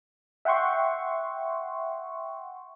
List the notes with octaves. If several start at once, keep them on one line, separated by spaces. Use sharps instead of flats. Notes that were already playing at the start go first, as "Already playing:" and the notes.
E5 F#5 G5 C6 C#6